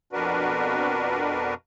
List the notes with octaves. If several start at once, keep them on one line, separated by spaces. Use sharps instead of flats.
F2 B2 D4 F#4 A#4 B4